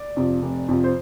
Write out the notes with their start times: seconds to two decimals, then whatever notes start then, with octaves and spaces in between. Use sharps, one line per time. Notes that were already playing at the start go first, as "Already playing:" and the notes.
Already playing: D5
0.17 F2 C3 F3
0.42 F1
0.68 F2 C3 F3
0.84 C5